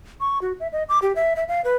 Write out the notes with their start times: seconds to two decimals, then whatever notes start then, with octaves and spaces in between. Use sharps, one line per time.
0.20 C#6
0.42 F#4
0.60 E5
0.72 D#5
0.89 D6
1.02 G4
1.16 E5
1.36 E5
1.48 F5
1.64 B4